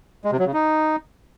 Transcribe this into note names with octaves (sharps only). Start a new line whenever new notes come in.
G#3
C3
F#3
C#3
D#4